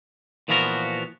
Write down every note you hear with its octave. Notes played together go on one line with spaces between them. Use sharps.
A#2 E3 F3 B3 F#4 A#4